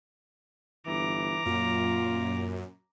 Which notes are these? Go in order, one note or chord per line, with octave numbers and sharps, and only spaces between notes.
G1 E3 A#5 D6
F#2 A#2 F4